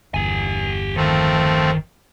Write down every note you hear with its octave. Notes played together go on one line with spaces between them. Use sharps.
G1 E2 G4 G#5
D#3 F3 A3 C4